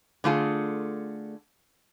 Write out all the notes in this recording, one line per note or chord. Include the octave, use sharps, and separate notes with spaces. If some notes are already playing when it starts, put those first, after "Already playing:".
D3 A3 F4 G#4